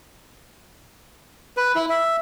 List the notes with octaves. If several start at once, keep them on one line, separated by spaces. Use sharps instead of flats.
B4
E4
E5